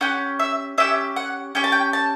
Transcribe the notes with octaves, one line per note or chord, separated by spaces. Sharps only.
C#4 G4 F#5
E5
C#4 G4 E5
F#5
C#4 G4 G5
A5
G5
A5